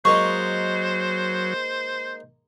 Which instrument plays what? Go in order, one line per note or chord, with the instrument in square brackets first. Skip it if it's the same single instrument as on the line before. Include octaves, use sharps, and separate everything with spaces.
[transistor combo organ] F#3 [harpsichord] G#3 A#3 D#4 [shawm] C5 [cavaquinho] C#6